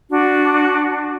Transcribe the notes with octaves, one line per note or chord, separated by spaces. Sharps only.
D4 F#4